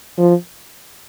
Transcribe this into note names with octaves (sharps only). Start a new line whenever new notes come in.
F3